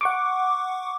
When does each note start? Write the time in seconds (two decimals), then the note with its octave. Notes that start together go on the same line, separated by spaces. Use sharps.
0.01 F#5 C#6 D6